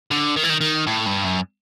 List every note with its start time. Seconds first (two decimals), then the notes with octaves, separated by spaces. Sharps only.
0.11 D3
0.36 D#3
0.43 E3
0.50 D#3
0.61 D#3
0.87 A2
1.06 G2
1.24 F#2